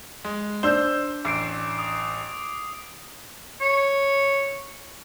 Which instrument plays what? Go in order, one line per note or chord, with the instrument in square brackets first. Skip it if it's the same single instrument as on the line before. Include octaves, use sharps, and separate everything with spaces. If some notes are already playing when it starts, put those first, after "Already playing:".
[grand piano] G#3
[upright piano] D4 G7 [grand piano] C5 E6 G6
[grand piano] A1 [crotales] D6 C7 D7
[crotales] D#6
[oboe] C#5